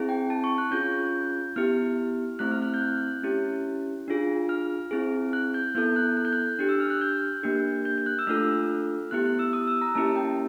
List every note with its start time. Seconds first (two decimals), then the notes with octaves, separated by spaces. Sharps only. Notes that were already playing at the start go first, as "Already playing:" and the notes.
Already playing: C4 E4 G#4
0.09 G5
0.30 A5
0.44 C#6
0.58 F#6
0.71 C#4 F4 G#4 G6
1.56 B3 E4 G4 F6
2.39 A3 C4 E4 F#6
2.51 F6
2.62 F#6
2.74 G6
2.81 F#6
3.23 C#4 E4 G4
4.08 D4 F4 G#4
4.49 F6
4.91 C4 E4 G#4
5.33 F#6
5.54 G6
5.75 B3 E4 A4 G6
5.96 F#6
6.17 F#6
6.25 G6
6.33 F#6
6.59 D4 G4
6.69 E6
6.80 F6
6.90 F#6
7.01 G6
7.43 A#3 D4 G4
7.85 G6
7.98 G6
8.06 F#6
8.19 E6
8.27 A3 D4 F4 A4 F6
9.11 B3 E4 G4 F#6
9.25 F#6
9.39 E6
9.53 D#6
9.67 E6
9.82 A#5
9.95 A#3 C#4 E4 G4 A5
10.16 G5